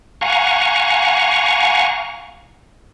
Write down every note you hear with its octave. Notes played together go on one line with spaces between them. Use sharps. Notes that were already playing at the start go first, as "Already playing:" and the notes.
F5 F#5 G#5 A#5 C#6